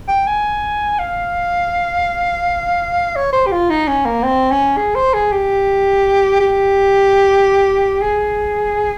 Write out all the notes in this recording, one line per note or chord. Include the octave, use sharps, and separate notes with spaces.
G5
G#5
F5
C#5
C5
G4
F4
D#4
C#4
A#3
C4
C#4
G#4
C5
G#4
G4
G4
G#4